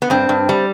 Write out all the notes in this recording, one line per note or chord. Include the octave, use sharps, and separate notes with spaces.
B3
G2 C4
G2
G3